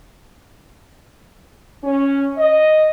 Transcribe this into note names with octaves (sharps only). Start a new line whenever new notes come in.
C#4
D#5